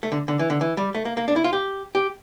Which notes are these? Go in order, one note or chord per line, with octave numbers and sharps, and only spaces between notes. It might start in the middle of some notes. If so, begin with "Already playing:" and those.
A3
D3
D3
E3
D3
E3
G3
A3
A#3
A#3
D4
E4
F4
G4
G4